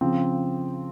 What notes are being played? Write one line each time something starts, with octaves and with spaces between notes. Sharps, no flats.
C#3 F3 C4